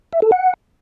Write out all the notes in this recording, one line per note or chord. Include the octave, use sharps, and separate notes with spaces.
E5
A4
F#5